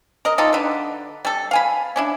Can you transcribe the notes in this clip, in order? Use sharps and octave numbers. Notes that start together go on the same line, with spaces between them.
A#4 D#5
D#4 F4 G4 A4
D3 B4
G3 A4
F5 G#5 B5
C#4 D4 E4